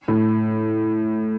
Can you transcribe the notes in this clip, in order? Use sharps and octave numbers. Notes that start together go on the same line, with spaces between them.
A2